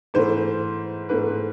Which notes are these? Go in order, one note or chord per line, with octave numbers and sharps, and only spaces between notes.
G#2 E3 A3 C5
G#2 E3 A3 B4